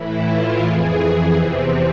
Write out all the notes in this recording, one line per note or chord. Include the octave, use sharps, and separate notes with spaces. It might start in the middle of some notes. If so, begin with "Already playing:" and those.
Already playing: A2 E3 E4
F4
F2 E3 G#4
E2 C3 E3 C4